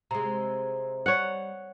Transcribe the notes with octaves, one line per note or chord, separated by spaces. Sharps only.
C3 G#3 A#5
G3 C#5 F#5